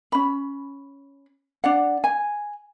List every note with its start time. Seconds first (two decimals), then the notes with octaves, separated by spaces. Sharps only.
0.12 C#4 B5
1.64 D4 D5 F#5
2.04 G#5